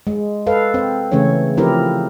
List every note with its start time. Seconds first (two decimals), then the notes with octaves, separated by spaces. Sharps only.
0.07 G#3
0.47 A4 B4 F5
0.74 C4
1.12 C#3 E3 A3 C#4 C#5
1.57 F3 C4 E4 G4 A#4